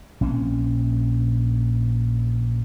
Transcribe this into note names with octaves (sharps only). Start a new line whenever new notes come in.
A#1 C4 C#4